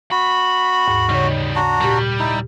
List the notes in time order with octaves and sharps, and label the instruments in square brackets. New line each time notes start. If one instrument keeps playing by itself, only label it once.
[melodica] F#4 [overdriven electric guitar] B5
[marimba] D#2 G#2
[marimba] C#3 C#5 [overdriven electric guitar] G3 D#4
[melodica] D4 F#4 A#5
[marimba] A#2 G4 [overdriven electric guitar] G3
[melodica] D#4 E4